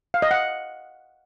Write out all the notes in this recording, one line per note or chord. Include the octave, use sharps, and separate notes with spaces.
F5
D#5
F#5